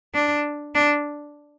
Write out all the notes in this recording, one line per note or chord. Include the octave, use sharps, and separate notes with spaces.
D4
D4